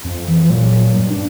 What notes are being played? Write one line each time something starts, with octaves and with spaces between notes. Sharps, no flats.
F2
E3
A#2 F#3
G2
D4